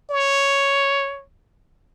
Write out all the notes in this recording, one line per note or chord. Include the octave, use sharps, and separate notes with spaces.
C#5